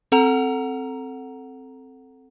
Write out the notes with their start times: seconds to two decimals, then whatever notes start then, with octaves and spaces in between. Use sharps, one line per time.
0.12 C4 A4 F#5 A#5 F7